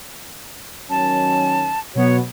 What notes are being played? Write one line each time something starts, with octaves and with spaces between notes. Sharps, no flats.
D#3 F#3 C#4 A5
B2 F#3 B3 F#4 C#5